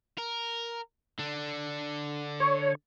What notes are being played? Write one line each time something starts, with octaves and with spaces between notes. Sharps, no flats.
A#4
D3 D4
C#5